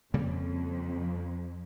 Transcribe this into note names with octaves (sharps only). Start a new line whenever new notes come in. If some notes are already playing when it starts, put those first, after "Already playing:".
F2 C#3 G3 A#3